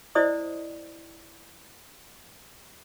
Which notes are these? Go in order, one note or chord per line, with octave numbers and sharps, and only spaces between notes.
E4 C5 D5 D#5 D#6